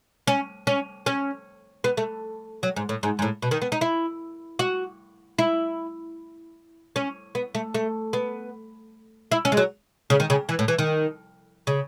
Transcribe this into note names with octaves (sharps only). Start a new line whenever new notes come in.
C#4
C#4
C#4
B3
A3
F#3
G#2
A2
G#2
G#2
A2
B2
D#3
B3
D#4
E4
F#4
E4
C#4
B3
A3
A3
B3
E4
C#4
G#3
F#3
C#3
D#3
C#3
E3
A2
E3
D#3
C#3